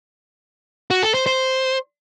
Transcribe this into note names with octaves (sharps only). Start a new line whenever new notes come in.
F#4
A4
C5
C5